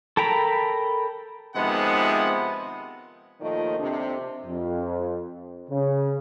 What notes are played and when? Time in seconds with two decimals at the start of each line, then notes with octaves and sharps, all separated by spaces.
0.17 A4 A#4 G5 A#5 B5
1.56 C3 D#3 F3 G#3 B3 F#5
3.41 D#2 A#2 D#3 F3 A3 D#5
3.78 F2 C3 D4
4.46 F2
5.70 C#3